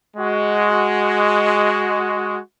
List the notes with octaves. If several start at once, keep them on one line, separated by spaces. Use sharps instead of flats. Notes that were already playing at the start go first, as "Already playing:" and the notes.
G#3 F#4